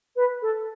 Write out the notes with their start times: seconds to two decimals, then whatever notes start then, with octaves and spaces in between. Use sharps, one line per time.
0.16 B4
0.42 A4